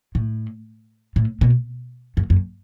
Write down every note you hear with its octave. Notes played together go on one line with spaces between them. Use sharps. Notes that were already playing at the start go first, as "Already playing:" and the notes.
A2
A2
B2
F#2
F#2